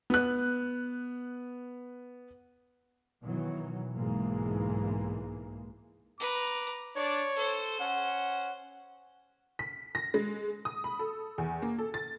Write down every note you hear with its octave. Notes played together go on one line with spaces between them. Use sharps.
B3 F#6
B2 D#3 E3 F#3
B1 G#2 E3 G#3 A#3
B4 A#5 D6
D4 C#5 D5
A4 C5
C#4 F#5
B6
A#6
G#3
D#6
B5
A4
E2
A#3
A4
A6